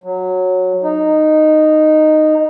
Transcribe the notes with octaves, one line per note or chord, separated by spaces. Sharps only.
F#3
D#4